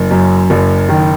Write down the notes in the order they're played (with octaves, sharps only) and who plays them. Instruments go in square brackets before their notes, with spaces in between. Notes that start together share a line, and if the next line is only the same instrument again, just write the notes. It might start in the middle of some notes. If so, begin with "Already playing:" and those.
Already playing: [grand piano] F#1
F#2
F#1
D#3